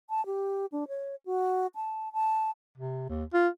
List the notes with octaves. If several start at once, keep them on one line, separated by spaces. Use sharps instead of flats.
A5
G4
D4
C#5
F#4
A5
A5
C3
D#2
F4